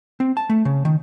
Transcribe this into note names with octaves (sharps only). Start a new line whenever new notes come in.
C4
A5
A3
C#3
D#3